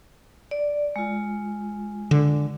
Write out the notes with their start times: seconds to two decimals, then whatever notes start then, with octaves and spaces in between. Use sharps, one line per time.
0.51 D5
0.96 G#3 F4
2.11 D3